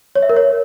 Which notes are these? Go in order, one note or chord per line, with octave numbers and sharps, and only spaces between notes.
C#5
E5
A#4
C#5